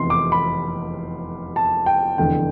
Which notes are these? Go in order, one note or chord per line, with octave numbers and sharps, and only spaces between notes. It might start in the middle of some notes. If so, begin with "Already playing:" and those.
Already playing: F1 E2 C3 C6
D6
B5
A5
G5
F1 E2 D3 G5